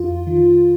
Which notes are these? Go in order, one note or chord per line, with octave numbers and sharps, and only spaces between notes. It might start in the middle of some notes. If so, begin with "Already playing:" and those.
Already playing: F2 F4
D#3